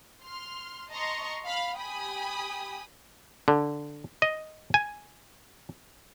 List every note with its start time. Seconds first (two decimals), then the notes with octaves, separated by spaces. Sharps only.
0.23 C6 F6
0.90 D#5 A5 A#5 C6 C#6
1.46 F5 B5
1.77 G4 G5 G#5 B5 D#6
3.48 D3
4.22 D#5
4.74 G#5